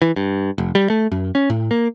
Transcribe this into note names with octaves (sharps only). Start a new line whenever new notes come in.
E3
G2
F1
G3
A3
F#2
C#4
A2
A#3